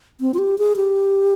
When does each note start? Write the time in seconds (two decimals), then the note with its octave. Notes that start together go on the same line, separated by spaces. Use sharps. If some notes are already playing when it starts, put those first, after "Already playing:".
0.21 C4
0.34 F4
0.38 G4
0.58 G#4
0.76 G4